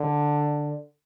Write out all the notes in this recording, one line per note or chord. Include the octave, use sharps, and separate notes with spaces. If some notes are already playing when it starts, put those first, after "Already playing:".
Already playing: D3